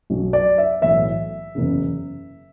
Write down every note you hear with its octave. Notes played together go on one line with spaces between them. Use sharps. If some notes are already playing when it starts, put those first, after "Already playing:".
B1 B2 F#3
D5
E5
B1 A2 E3 E5
F#1 E2 C#3